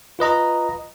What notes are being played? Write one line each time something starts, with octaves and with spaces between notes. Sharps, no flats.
F4 B4 D#5 A#5